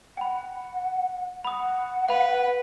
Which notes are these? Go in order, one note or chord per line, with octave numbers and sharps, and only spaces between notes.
F#5 G5 B5
F#5 B5 D#6
B4 F5 B5